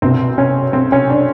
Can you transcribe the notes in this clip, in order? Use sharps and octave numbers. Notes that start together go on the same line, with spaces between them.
C2 B2 C4
C#4
C4
C#4
D4